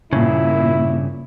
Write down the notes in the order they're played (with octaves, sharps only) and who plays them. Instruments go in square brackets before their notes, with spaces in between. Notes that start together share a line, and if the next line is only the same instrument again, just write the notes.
[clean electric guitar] G2 C#3 [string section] A#2 [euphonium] E4